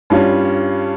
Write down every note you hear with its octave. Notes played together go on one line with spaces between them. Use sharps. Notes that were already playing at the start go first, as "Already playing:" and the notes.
G2 G3 C#4 F4